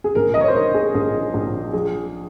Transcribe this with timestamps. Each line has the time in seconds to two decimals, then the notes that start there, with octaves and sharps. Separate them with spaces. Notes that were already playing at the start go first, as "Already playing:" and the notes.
0.04 G#4
0.15 A#1 A#4
0.34 D#5
0.41 C#5
0.48 C5
0.55 G#2 A#4
0.74 G#4
0.94 A#1 G#4
1.34 A#1
1.73 F3 G#4